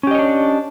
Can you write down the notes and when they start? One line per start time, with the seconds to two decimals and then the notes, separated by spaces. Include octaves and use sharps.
0.03 C#4
0.07 G4
0.11 D#5
0.15 C#5
0.19 D4